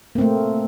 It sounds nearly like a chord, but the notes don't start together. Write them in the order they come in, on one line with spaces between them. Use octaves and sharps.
A#3 C4 A3